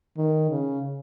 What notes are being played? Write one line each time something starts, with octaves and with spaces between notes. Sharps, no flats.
D#3
C#3